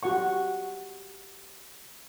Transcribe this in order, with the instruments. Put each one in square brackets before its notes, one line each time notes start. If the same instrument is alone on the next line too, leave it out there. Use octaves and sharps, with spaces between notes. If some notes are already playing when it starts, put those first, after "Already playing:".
[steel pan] F#4 G4 F#5 C#6